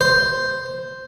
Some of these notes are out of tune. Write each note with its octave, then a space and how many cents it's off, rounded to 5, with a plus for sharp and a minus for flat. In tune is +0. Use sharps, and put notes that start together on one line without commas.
C5 -5